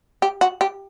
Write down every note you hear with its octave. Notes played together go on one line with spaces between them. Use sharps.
G4
F#4
G4